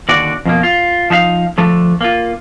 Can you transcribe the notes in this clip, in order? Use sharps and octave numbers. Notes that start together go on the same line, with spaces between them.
D#2 D3 F#4 D5
F2 B2 A#3
F4
F3 D#4 E5 F5
D3 F3 A3 A4
A#3 F4